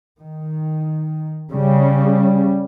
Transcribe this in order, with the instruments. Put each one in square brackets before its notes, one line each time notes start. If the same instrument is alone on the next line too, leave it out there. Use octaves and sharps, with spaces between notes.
[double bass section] D#3
[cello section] C#3 [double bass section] G3